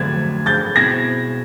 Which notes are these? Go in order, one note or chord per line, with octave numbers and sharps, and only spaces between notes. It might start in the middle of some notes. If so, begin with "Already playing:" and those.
Already playing: F2 D3 F#3 A3 D4 G#6
G6 A6
B2 G#3 C4 E4 G#4 G#6 A#6